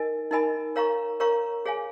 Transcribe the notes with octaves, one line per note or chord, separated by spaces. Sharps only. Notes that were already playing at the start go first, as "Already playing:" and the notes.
Already playing: D#4 A#4 D#5 G#5
D#4 A#4 D#5 G#5 B5
A#4 C#5 F5 A#5 C#6
A#4 C#5 F5 A#5 C#6
G#4 C#5 F5 G#5